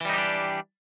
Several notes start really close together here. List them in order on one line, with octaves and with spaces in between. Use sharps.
E3 G3 D#4 G4 D4